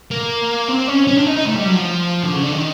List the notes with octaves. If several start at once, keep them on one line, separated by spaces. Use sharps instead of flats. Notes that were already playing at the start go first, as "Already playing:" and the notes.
A#3
C4
C#4
C#4
D4
D#4
D#4
A3
G3
F#3
F3
D3
C#3
D3
D#3